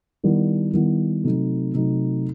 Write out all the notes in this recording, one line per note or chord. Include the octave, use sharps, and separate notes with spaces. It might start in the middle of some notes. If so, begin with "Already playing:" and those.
D#3 G3 B3 E4
D#3 G3 B3 E4
C3 F#3 A3 D#4
C3 F#3 A3 D#4